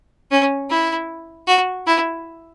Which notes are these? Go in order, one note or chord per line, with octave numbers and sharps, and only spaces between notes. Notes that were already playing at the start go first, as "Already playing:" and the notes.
C#4
E4
F#4
E4